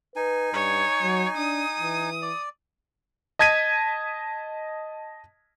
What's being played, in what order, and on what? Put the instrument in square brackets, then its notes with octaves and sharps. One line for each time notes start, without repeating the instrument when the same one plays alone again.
[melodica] D#4 G#5 [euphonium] B4
[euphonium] G2 [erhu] C#5
[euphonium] F#3
[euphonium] D4 [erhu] D#6
[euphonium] E3
[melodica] D5
[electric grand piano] D#5 A5 G#6 B6 D#7